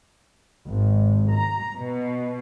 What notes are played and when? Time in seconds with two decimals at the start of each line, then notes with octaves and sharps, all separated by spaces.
0.70 G#1
1.33 A#5
1.78 B2